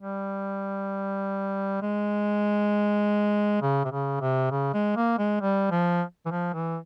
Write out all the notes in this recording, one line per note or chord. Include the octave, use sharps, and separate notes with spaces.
G3
G#3
C#3
C3
C#3
C3
C#3
G#3
A#3
G#3
G3
F3
E3
F3
E3